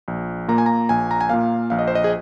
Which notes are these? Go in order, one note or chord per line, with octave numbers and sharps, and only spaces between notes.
A#1
A#2 A#3 A#5
G#5
A#5
A#1 G#5
A#5
G#5
A#2 A#3 F5
A#1 F5
D#5
C5
D#5
G#4